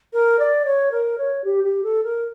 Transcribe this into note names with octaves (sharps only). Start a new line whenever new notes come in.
A#4
D5
C#5
A#4
C#5
G4
G4
A4
A#4